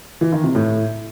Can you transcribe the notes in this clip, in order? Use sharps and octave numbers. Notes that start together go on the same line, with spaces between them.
E3
D#3
C3
A2